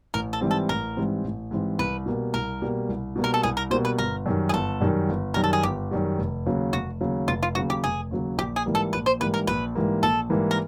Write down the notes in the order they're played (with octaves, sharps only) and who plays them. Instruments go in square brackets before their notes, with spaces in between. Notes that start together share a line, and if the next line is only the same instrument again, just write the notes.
[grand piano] A1 [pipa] A#4
[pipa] A4
[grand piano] G#2 E3 G3 C4
[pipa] A4
[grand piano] A1 [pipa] A#4
[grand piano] G#2 E3 G3 C4
A1
G#2 E3 G3 C4
[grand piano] C2 [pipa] B4
[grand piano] B2 G3 A#3
[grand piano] C2 [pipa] A#4
[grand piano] B2 G3 A#3
C2
B2 G3 A#3
[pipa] A#4
A4
[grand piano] C2 [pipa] G#4
[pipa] A#4
[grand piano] B2 G3 A#3 [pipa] C5
[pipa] B4
[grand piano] G1 [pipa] A#4
[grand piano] F#2 D#3 G3
[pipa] G#4
[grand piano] G1 [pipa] A4
[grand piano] F#2 D#3 G3
G1
[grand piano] F#2 D#3 G3 [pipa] A#4
[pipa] A4
G#4
[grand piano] G1 [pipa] G4
[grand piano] F#2 D#3 G3
F1
D#2 C#3 F#3
[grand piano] F1 [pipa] F#4
[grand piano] D#2 C#3 F#3
[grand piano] F1 [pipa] F4
[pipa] F4
[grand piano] D#2 C#3 F#3 [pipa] F#4
[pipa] G4
[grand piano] F1 [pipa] G#4
[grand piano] D#2 C#3 F#3
[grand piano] A#1 [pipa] G4
[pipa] G#4
[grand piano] G#2 E3 G3 A#3
[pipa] A4
[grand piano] A#1 [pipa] B4
[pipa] C5
[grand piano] G#2 E3 G3 A#3 [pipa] B4
[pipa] A#4
[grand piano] A#1 [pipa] B4
[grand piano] G#2 E3 G3 A#3
[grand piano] A#1 [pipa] A4
[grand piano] G#2 E3 G3 A#3
[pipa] A#4